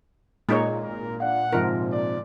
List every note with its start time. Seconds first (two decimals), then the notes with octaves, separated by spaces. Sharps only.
0.49 A#2 G#3 D#4 C#5
0.82 G#1 A#4
1.20 D4 F5 F#5
1.53 G#2 C3 F3 A#4
1.93 D5